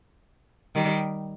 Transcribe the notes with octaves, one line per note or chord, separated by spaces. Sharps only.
D#3 G3